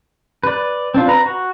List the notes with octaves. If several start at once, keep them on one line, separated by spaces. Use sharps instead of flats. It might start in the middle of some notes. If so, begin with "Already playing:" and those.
B4 D5
C4 D4 F4
B4 A#5 B5
F#4